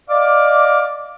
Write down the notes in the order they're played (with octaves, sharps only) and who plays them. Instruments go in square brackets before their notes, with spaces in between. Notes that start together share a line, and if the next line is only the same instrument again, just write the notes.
[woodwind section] D5 D#5 F5 D6